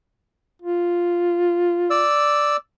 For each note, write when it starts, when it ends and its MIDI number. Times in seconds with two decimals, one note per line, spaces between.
0.62 2.06 65
1.90 2.57 74
1.90 2.57 88